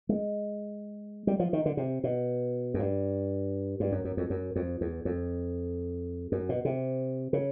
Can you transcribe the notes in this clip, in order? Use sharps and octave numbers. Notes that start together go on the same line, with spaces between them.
G#3
G3
F3
D#3
D3
C3
B2
F#2
G2
G2
F#2
F#2
F2
F#2
F2
E2
F2
F#2
B2
C3
C#3